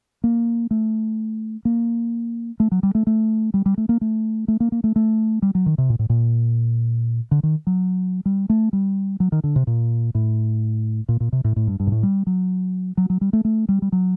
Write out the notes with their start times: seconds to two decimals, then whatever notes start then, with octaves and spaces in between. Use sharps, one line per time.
0.24 A#3
0.71 A3
1.65 A#3
2.60 A3
2.72 F#3
2.83 G3
2.95 A3
3.07 A3
3.54 G3
3.66 G3
3.78 A3
3.89 A#3
4.01 A3
4.48 A3
4.60 A#3
4.72 A#3
4.84 A3
4.96 A3
5.42 G3
5.55 F#3
5.66 D#3
5.78 C3
5.90 A#2
5.99 A2
6.10 A#2
7.31 D3
7.43 D#3
7.67 F#3
8.26 G3
8.50 A3
8.73 G3
9.20 F#3
9.32 D#3
9.44 D3
9.56 C3
9.67 A#2
10.15 A2
11.09 A#2
11.20 A#2
11.33 C3
11.44 A2
11.56 A2
11.67 G2
11.80 G2
11.87 A#2
11.92 A2
12.03 G3
12.27 F#3
12.97 F#3
13.10 F#3
13.21 G3
13.33 A3
13.45 A3
13.69 G3
13.82 G3
13.92 F#3